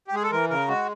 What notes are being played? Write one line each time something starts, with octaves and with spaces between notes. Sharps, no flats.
G4
G#3 G#4
A4
E3 A#4
C#3 A#4
G#3 F#4